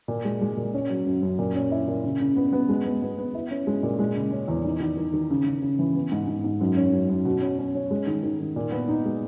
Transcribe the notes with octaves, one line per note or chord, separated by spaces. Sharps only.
A#2
G#3
G#3
A#2
C#4
F#3
F#2
F#2
A#2
C#4
E4
A#2
C#3
C#3
B3
B3
G#3
B3
B3
B3
E4
C#4
G#3
A#2
G#3
C#3
C#4
E2
D#4
D#3
D#3
D#3
C#3
C#3
C#3
E3
B3
G#2
G#2
G#2
F#2
C#4
F#2
F#2
B2
C#4
C#4
C#4
G#3
D#3
D#3
D#3
A#2
B3
D#4
G#3